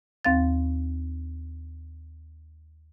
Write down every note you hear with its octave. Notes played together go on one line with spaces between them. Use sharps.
D#2 C4 F5 A6